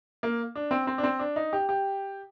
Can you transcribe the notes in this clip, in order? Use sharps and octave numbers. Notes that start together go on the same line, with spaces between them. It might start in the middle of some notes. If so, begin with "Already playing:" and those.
A#3
D4
C4
C4
D4
C4
D4
D#4
G4
G4